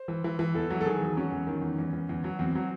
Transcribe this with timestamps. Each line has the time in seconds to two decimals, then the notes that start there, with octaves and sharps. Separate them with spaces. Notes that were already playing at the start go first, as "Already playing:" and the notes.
Already playing: C5
0.08 E3
0.24 E3
0.39 E3
0.55 E2 A4
0.70 F#3
0.81 A4
0.86 D#3 G#4
1.01 E2
1.17 F#3 C#4
1.32 E2
1.47 D#3
1.62 E2
1.79 E2
1.93 E2
2.09 E2
2.24 F#3
2.39 E2 C4
2.55 F#3